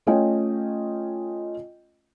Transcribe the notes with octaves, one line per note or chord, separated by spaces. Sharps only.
A3 C#4 F4 D#5 G5 G#5